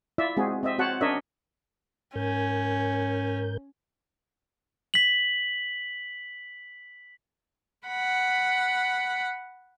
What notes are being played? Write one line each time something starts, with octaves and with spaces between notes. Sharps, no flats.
E4 F4 D5 E5
G#3 C4 F#4 G#4
C4 D#5 E5
C4 F#4 C5 C#5 F#5 A5
C#4 D4 A#4 C#5 D#5 E5
G#2 C#4 A#4 G6
B6 F#7
F#5 B5